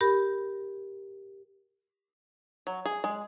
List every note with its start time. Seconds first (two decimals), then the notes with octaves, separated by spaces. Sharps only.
0.01 G4 A#4 B5
2.67 F#3
2.86 G#4
3.04 G#3